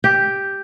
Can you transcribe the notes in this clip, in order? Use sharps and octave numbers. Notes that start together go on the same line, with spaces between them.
G4